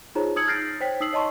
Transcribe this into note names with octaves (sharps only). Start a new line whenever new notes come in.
D#4 F4 G#4 C5 C#5 A#5
D#4 D#6 E6 G#6 C#7 F#7
F6 G6 A6 A#6 C7 D7
C5 C#5 G5 B6
D#4 D#6 E6 C7 F#7
C#5 D#5 A5 C6 C#6